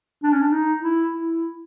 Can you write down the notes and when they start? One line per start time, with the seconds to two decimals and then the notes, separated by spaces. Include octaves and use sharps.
0.23 D4
0.32 C#4
0.42 D4
0.52 D#4
0.83 E4
1.12 E4